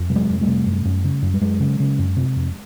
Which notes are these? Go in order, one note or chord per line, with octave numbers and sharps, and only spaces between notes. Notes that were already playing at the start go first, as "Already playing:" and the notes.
Already playing: F2
C3 G3
F#3 G#3
F2
G3 A3
C3
F#2
F#2
C#3
F#2
G3
F#2 F#3 G#3
C#3
C#3
F#2
C3
F2